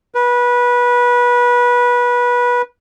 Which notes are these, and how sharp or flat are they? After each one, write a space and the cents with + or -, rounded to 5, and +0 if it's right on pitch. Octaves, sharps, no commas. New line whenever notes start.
B4 -20